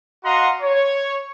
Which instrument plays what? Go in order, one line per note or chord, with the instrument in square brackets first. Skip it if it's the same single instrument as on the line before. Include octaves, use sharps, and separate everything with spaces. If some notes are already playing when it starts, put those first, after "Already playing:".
[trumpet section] F#4 D#5 F5 F#5 A#5 C6
C#5